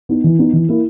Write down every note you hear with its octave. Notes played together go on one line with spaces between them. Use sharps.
B3 D#4
E3
B3 D#4
E3
A#3 E4